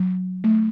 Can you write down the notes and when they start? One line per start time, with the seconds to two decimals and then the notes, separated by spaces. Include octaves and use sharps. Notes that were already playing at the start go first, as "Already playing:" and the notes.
Already playing: F#3
0.44 A3